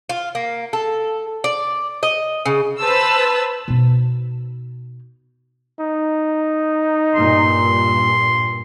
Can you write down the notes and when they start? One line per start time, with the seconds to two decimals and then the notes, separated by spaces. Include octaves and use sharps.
0.09 F4
0.35 A#3
0.73 A4
1.44 D5
2.03 D#5
2.46 C#3
2.79 B4 C5 A5 E6
3.68 B2 D#4
5.80 D#4
7.15 G2 A#2 C6